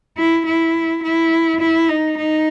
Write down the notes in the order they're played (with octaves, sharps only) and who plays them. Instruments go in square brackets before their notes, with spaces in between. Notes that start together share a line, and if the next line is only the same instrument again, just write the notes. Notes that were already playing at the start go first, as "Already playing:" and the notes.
[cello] E4
E4
E4
E4
D#4
D#4